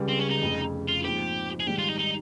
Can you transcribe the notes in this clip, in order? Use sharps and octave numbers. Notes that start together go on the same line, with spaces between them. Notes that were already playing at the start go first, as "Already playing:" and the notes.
Already playing: C#2 C#3 G3
C4
C#4
D#4
F1 F2 C#3
F4
A#1 G#2 F3 C4 G4
G#4
G#1 G#2 G3 G4
F4
D#4
D#4